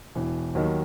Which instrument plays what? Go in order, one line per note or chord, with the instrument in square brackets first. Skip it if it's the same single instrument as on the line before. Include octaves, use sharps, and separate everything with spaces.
[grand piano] E1 [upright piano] E3
[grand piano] D#2 D#3 [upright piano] F#3